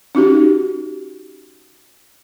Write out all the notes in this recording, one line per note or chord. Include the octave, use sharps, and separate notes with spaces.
C#4 D#4 F#4 G4